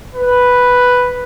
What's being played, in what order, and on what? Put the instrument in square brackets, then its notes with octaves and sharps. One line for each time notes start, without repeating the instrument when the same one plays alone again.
[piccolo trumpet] B4